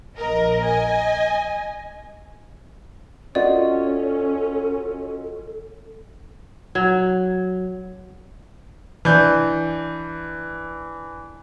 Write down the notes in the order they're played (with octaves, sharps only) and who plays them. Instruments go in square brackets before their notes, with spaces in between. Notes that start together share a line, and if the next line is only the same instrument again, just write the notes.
[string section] A#1 A#4 D#5
D#5 G#5
[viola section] C#4 [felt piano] F4 F#4 D#5 [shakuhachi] A4 [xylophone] D5
[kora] F#3
[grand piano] E3 D4 G6